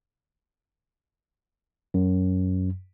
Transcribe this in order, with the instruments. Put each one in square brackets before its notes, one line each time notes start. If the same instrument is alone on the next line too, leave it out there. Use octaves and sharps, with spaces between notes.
[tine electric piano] F#2